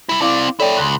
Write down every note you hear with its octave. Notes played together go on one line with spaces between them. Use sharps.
G3 E4
C4 E4 D5 F5 D6
E4 A4 C#5 D5 G5
C#2 C6 F#6